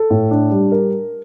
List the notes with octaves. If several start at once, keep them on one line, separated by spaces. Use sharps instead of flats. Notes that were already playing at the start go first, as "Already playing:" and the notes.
Already playing: A4
A2
D4
G3
A#4